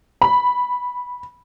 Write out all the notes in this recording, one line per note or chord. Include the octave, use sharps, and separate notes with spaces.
B5